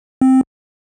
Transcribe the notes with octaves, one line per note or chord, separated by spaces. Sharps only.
C4